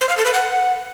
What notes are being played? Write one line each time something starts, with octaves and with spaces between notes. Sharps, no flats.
C5
F5
A4
B4
F#5